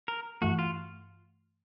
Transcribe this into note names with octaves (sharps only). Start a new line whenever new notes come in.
A#4
G2 E3 A3 F#4
F4